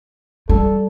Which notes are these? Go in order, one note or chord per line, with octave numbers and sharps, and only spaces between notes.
G3 A4